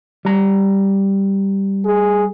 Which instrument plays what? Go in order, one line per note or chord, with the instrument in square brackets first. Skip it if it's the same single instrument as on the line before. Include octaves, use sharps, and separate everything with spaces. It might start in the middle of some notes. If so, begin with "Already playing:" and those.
[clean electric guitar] G3 A#5
[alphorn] G#4